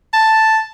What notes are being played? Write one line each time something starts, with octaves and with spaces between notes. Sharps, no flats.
A5